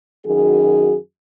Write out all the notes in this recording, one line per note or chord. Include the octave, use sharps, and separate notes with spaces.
F#2 D#3 F#4 G#4